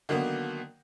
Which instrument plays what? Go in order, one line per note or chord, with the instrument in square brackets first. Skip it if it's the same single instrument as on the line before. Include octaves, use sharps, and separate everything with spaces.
[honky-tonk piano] D3 D#3 F#3 A#3 B3